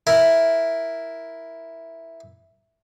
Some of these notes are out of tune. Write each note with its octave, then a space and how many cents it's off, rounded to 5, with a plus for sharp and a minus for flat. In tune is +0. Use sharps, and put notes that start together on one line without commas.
E4 +0 A#4 +0